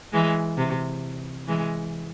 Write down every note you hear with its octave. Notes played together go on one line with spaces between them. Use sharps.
E3 G#3
C3
E3 G#3